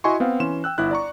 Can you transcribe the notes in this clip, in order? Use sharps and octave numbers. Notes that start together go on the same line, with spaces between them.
E4 F#4 D#5 G#5 C6 C#6
B3 C4 F5
E3 C#4 C6 E7
G5 E6 F#6
G1 E4 F#6
D5 A#5 C#6